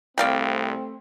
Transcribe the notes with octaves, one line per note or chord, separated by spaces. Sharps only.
C2 A3 C4 D5 F5 G5